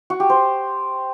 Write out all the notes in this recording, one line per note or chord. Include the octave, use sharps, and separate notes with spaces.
F#4
G4
C5